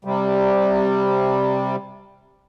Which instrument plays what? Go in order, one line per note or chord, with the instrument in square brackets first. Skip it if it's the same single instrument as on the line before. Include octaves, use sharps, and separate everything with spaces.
[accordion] C3 G3